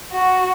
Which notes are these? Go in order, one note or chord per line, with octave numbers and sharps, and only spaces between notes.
F#4